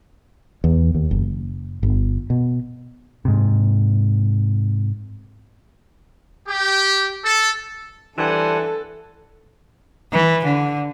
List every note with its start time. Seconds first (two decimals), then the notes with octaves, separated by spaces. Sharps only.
0.64 E2
0.95 D#2
1.11 F#1
1.83 G1
2.30 B2
3.25 G#2 C3
6.48 G4
7.23 A4
8.18 E3 G3 D4 G4 A4 C5 F#5 G#5
10.12 E3
10.45 D3